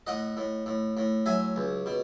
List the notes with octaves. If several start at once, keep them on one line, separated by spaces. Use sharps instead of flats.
A2 D#5 F#5
A2
A2
A2
F#3 E5 G#5
C#2
B2